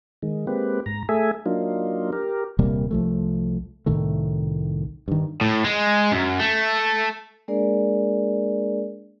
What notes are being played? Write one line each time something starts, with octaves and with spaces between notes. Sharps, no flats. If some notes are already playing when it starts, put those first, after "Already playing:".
D#3 G#3
G#3 A#3 C4 G4 B4
G#2 A#5
A3 G#4 A4 E5 G#5
F#3 A#3 D4 D#4 F4
G4 A#4
D#1 C3 G3 A#3
C2 F3 A3
C2 A2 D#3 A3
G2 D#3
A2
G#3
F#2
A3
G#3 A#3 D4 G#4 A#4 D5